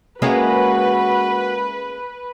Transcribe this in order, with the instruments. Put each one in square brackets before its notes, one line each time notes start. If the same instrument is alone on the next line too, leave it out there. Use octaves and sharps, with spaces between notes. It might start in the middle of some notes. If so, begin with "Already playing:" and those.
[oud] G#3 A#3 C#4 [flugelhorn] F#4 [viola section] B4